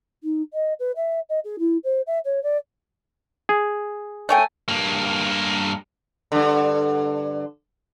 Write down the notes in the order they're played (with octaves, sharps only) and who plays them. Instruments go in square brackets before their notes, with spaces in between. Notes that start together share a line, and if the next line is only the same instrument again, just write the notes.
[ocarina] D#4
D#5
B4
E5
D#5
G#4
E4
C5
E5
C#5
D5
[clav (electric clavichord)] G#4
[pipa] A3 C#5 G5 [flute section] G#5
[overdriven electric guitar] G2 A#3
[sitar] G2 D3